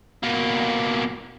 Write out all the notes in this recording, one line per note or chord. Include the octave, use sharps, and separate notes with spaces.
B2 A#3